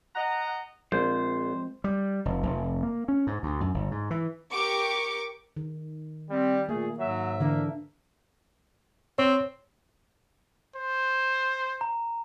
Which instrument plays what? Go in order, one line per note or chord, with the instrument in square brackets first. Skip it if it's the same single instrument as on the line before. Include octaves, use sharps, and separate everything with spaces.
[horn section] D#5 F#5 A#5
[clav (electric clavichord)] A#1 [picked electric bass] F3 G#3 C4 [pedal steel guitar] C5
[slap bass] G3
F1
F1
A#3
C#4
G#2
D2
F#2
G1
G#2
E3
[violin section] G4 A#4 C#6 D6
[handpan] D#3
[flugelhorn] G3 [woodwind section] C4
[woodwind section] A#2 A3 [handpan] A#3 [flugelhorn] G#4
[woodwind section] G#2 E5 [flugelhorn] F#3
[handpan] D3 E3 D4 [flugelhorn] A#3
[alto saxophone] C4 [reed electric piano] C#5
[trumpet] C5
[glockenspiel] A#5